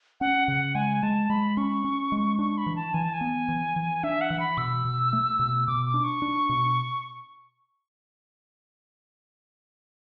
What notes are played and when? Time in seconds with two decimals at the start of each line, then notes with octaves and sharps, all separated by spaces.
0.21 C#4 F#5
0.48 C#3 F#5
0.75 G#3 G#5
1.03 G#3 A5
1.30 G#3 B5
1.57 C#4 C#6
1.85 C#4
2.12 G#3
2.39 D4 C#6
2.58 B5
2.66 E3
2.76 A5
2.94 E3 G#5
3.04 A5
3.13 G#5
3.21 B3
3.49 E3
3.76 E3
4.03 D4 E5
4.21 F#5
4.30 E3
4.40 B5
4.57 B2 E6
4.85 B2
5.13 A3
5.39 B2
5.67 B2 D6
5.86 D6
5.94 D4
6.04 C#6
6.22 D4
6.49 B2